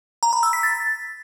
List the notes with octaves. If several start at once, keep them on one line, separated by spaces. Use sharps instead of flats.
A#5
B5
E6
B6
A6